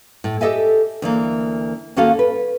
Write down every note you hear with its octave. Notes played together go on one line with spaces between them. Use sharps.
A2
G4 A4 D#5 E5 G#5
D2 E3 A#3
D#2 A#3 C#4 F#4 A4 F5
B4